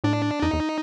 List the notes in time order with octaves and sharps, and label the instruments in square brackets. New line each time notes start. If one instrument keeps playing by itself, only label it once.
[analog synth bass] A2 [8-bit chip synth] D4
[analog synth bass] F2 [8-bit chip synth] D#4
[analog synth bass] E2